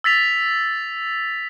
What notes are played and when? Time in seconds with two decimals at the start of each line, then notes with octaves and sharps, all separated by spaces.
0.04 E6 A6 B6 F7